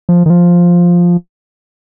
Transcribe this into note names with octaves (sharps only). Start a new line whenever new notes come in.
F3
D#3
F3